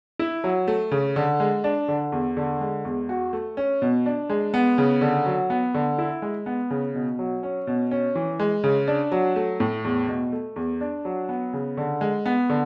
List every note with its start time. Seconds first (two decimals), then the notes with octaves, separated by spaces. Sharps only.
0.19 E4
0.44 F#3
0.68 A3
0.91 C#3
1.16 D3
1.40 G#3
1.64 D4
1.88 D3
2.12 E2
2.37 D3
2.61 G#3
2.85 E2
3.09 F#4
3.33 A3
3.57 C#4
3.82 B2
4.06 D4
4.30 G#3
4.54 B3
4.78 C#3
5.01 D3
5.26 F#3
5.50 B3
5.74 D3
5.98 E4
6.22 G#3
6.46 B3
6.70 C#3
6.95 B2
7.19 F#3
7.43 C#4
7.67 B2
7.91 C#4
8.15 E3
8.40 G#3
8.64 C#3
8.88 D4
9.12 F#3
9.36 A3
9.60 A2
9.84 E2
10.08 B2
10.32 A3
10.56 E2
10.81 D4
11.05 F#3
11.29 B3
11.53 C#3
11.77 D3
12.01 G#3
12.26 B3
12.50 D3